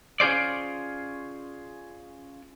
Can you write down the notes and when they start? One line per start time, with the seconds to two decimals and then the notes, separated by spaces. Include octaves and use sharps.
0.20 C#4 F4 G#4 C5 D5